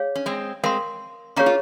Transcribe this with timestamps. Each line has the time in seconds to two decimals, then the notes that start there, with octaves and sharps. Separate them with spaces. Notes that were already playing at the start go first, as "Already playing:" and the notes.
Already playing: G#4 C#5 F5
0.15 C#4
0.26 G#3 C4
0.63 G#3 C4 A#4 F5 C6
1.36 A#3 C#4 G#4 C#5 F5 A#5 C#6
1.46 F4